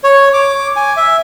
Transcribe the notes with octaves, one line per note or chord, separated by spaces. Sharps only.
C#5
D6
G#5
E5